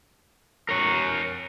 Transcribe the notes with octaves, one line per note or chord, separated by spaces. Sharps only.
A#4 C#5